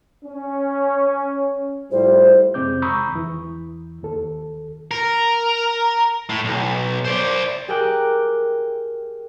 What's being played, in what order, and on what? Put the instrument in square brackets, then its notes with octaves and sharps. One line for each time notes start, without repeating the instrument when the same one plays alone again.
[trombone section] C#4
[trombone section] A2 F3 G3 [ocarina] C5
[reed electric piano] F2 C3 G#3 C4 D6 G6
A#5 B5 C#6 D#6 E6 G6
E2 E3
D#2 A4
[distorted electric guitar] A#4
A2
B1
C5 D5
[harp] G4 G#4 A#4 G5 D6 F#6